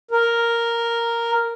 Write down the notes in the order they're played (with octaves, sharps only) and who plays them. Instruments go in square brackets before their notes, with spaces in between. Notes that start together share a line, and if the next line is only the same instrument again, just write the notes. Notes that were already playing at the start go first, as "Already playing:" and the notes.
[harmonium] A#4